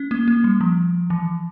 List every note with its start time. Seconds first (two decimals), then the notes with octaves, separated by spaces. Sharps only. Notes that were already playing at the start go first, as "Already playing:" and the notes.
Already playing: C#4
0.11 A#3
0.28 A#3
0.44 G3
0.61 F3
1.10 E3